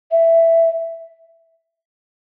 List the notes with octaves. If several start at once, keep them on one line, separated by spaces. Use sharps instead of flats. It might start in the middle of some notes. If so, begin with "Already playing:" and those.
E5